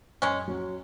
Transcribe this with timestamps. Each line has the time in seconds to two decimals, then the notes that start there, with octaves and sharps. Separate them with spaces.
0.22 F#2 G#3 C#4
0.48 F#3 C#4 F#4